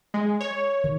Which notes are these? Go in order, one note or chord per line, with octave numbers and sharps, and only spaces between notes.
G#3
C#5
D#3